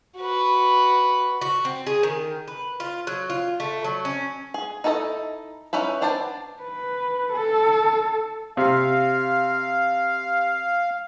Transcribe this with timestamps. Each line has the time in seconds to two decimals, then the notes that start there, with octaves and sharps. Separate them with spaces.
0.17 F#4 B4
1.41 F#4
1.65 C4
1.87 G#4
2.03 D#3
2.48 B4
2.80 F4
3.07 F#3
3.30 F4
3.60 A3
3.84 F#3
4.05 C#4
4.54 G#4
4.84 D#4 E4 A4 C#5 D#5
5.73 C#4 D#4 E4 B4
6.01 B3 D4 C5 D5 A5
6.62 B4
7.33 A4
8.57 C3 F5